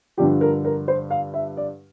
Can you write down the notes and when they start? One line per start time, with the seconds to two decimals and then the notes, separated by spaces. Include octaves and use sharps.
0.17 G2 D3 F3 G4
0.41 A#4
0.65 A#4
0.88 C5
1.10 F5
1.34 E5
1.57 D5